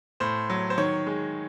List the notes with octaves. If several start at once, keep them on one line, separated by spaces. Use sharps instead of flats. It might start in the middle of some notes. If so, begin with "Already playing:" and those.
A2 C5
F#3
C5
D#3 C#5
G#3